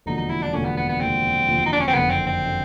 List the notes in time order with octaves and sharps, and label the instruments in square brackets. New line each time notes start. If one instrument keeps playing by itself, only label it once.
[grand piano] E1 D#2 D3 F3 [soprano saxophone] D#4
[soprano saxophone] D#4
E4
D4
[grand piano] E1 D#2 D3 F3 [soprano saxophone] C#4
[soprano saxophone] B3
B3
B3
[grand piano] E1 D#2 D3 F3 [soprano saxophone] C4
[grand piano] E1 D#2 D3 F3
[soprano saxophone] D#4
D4
C#4
C4
[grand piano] F#1 F2 D3 [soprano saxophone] B3
[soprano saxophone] C4
C4
[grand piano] D3